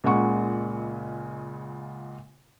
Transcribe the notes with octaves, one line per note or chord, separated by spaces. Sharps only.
C#2 A#2 C#3 G#3 F#5 C#6